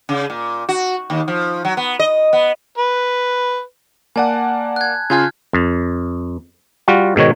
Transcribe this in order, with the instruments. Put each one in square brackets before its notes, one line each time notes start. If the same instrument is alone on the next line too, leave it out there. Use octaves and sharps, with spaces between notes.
[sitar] C#3
A#2
F#4
D#2
F3
F#3
B3
D#5
B3
[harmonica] B4
[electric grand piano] A#3 D5 F#5 [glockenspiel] G#5 A5
[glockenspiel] F#6 G#6
[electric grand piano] C#3 F4 G#5 [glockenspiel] F6 G6 G#6
[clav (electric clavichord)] F2
G3 F4 F#4
G#2 B2 D#3 C#5